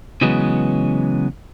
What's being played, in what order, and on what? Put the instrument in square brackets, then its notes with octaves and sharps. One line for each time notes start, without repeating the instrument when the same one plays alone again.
[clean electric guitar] C#3 E3 F#3 G#3 B3 C#4